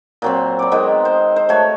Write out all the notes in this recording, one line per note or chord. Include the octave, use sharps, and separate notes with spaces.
A#2 F#3 C4
D5 B5
D#3 G#3 B3 C4
C5
C5
A3 F#4 C#5